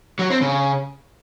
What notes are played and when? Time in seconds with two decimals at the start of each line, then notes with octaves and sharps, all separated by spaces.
0.19 F#3
0.30 C4
0.41 C#3